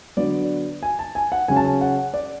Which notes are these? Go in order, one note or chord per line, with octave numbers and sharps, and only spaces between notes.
D3 F#3 B3 D5
G#5
A5
G#5
F#5
C#3 F#3 C#4 G#5
A5
G#5
F#5
D5